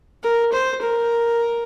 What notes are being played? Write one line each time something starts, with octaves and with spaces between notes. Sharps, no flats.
A#4
C5
A#4